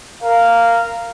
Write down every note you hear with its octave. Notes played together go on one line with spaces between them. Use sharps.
A#4 F5